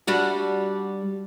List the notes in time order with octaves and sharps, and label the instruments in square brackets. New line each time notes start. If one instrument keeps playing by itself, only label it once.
[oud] G3 D4 F#4